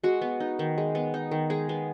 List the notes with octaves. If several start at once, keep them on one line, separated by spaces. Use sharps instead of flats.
G#3 F#4
B3
D#4
D#3
G#3
B3
D#4
D#3
G#3 G#4
B3